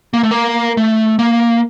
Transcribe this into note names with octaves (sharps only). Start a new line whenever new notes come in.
A#3
A3
A#3
A3
A#3